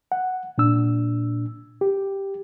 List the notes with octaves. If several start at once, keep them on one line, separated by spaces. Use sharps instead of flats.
F#5
A#2 D4 E6
G4